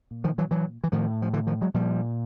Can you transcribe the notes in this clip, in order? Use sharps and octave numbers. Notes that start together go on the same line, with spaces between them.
A#2
D#3 F3
E3 F#3
E3 F#3
E3
A2 D#3 F3
F3
D3 E3
D#3 F3
F#3 G#3
A#2 F3 G3